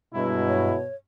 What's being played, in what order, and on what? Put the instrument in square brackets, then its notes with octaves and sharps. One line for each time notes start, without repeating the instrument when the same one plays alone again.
[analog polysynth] G2 [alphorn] B2 [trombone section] F#3 G#3 E4
[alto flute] C#5